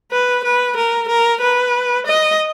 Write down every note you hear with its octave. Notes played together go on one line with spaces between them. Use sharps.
B4
B4
A#4
A#4
B4
D#5